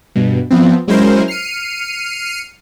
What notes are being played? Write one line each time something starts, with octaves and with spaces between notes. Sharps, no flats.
G2 B2
F3 B3 C4
F#3 G#3 C#4 E4 A#4 C5
F6 C7 C#7 D#7